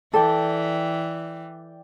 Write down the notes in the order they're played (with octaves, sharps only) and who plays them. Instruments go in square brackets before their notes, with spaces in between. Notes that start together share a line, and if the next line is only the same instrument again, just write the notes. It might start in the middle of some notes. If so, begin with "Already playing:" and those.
[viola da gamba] E3 [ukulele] A4 [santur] D5 G5 D6